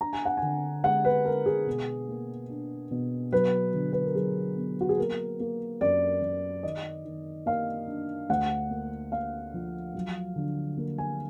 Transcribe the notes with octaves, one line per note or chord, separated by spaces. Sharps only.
D4 A#5
G#5
F#5
D3 G#5
G#3 F#5
B4
G#3 A#4
G#4
B2
A#3
D4
B2
F#3 B4
D3
B4
A#4
F#3 G#4
B3
F#4
G#4
A#3 A#4
A#3
F#2 D5
F#2
D#3 D#5
D#3
A#3 F5
D4
D2 F#5
A#3
A#3 F5
F3
F#3
D3
A#3
G#5